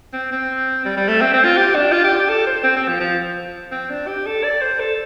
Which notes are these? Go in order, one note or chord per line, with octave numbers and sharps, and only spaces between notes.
C4
C4
G3
G3
A3
C4
C4
F4
G4
D4
F4
G4
G4
A4
C5
C4
C4
F3
F3
C4
D4
G4
A4
D5
C5
A4